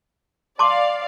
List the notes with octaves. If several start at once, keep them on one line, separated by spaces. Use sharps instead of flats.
D5 F5 A5 C6 D6